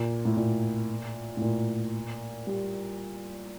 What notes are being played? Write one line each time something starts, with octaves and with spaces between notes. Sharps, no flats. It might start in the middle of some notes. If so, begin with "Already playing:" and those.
Already playing: A#2
A2
A#2
A2
A#2
G3